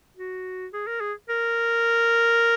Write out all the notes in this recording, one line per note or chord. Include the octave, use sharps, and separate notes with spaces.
F#4
G#4
A#4
G#4
A#4